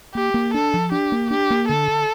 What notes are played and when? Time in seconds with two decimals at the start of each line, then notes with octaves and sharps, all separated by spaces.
0.15 A#3 G4
0.34 A#3
0.54 D4 A4
0.73 F3
0.92 D4 G4
1.12 A#3
1.31 D4 G4
1.50 A#3
1.68 D3 A4
1.88 D3